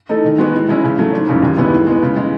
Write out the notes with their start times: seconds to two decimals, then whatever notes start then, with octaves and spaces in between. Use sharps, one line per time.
0.09 E3 A3 D#4 A4
0.25 D#3
0.38 G#3 B3 F#4 B4
0.54 A2
0.68 E3 G#3 C#4 E4
0.84 C#3
0.99 F#3 A3
1.13 G#1
1.27 F#2 C#3 E3
1.42 D#2
1.57 C#3 G#3 B3 E4
1.73 A2
1.87 G#3 B3
2.02 C#3
2.16 E3 G#3